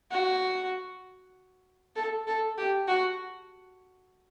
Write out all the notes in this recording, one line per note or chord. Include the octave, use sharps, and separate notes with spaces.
F#4
A4
A4
G4
F#4